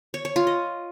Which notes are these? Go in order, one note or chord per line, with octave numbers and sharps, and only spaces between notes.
C#5
C#5
F4
D#5